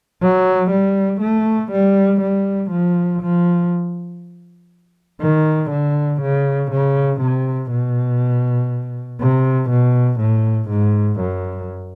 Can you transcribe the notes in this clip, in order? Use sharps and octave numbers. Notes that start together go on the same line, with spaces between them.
F#3
G3
A3
G3
G3
F3
F3
D#3
D3
C#3
C#3
C3
B2
C3
B2
A2
G#2
F#2